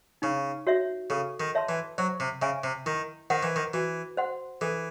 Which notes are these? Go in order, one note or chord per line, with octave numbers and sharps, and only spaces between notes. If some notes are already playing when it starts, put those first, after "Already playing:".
C#3 D#4
F#4 C#5 E5
C#3 A4
D#3
C#5 E5 A5 C6
E3
F#3 C5
C3
C#3 E5 G#5
C3
D#3 E4
D#3 C5 F#5
E3
D#3
E3 F#4
C5 F#5 C6
E3 A4